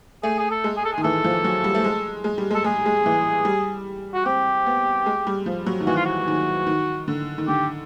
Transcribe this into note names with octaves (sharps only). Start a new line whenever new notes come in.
A3 G#4
G#4
A4
G#3
G#4
A4
G#4
D#3
E3 A4
F3
F#3
G3
A3
G#3
G#3
G3
G#3
A4
G#3 G#4
G#3
E3
G3
F#4
C4 G4
B3
G#3
G3
F3
F#3
D#3
E3 F#4
F4
F#4
D#3
D#3
D3
D#3
D3 G4